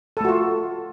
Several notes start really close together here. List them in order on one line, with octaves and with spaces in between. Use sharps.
A4 A3 F#4 F4